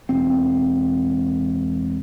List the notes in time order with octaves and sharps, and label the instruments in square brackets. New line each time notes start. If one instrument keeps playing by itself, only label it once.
[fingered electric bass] E1 C4